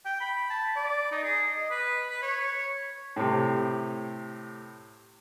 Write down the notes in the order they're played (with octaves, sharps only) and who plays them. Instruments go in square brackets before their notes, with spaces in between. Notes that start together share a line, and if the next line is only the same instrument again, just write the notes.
[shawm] G5
B5
A5
D5
D#4
G#4
D#5
B4
B4
C#5
[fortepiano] A2 C3